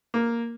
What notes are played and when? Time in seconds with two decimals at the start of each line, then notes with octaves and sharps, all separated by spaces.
0.14 A#3